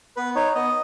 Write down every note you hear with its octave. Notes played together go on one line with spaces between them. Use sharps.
B3 B4
D#4 C#5
B3 D#5